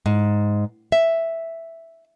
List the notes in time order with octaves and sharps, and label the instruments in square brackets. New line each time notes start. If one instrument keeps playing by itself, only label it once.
[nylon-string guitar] G#2
E5